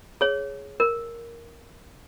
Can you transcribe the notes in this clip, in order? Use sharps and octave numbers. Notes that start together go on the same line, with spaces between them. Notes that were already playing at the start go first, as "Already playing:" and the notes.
G#4 C#5
A#4